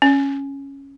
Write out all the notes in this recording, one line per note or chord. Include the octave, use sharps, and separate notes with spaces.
C#4